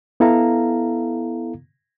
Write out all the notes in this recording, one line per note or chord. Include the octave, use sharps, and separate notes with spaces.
B3 E4 A4 F5 A#5